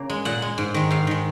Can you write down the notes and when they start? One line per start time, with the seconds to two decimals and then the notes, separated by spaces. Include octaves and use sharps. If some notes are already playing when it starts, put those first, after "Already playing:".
Already playing: C#3 A#3
0.10 G#3
0.25 A#2 F#5
0.42 G#3
0.58 G#2
0.74 D#3 G#3
0.91 G#2 F5
1.07 D#3 G#3